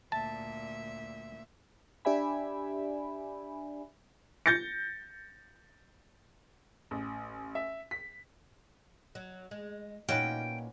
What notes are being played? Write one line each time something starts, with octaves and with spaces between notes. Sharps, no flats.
D2 A#2 E5 A5
D4 G4 D5 E5 G#5 B5
G6 A6 A#6 C#7
A1
E5
B6
F#3
G#3
A#2 C#4 D#4 F4 F#4 B4 G5